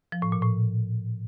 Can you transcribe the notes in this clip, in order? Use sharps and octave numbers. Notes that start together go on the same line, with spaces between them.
F3
A2
A#2
A2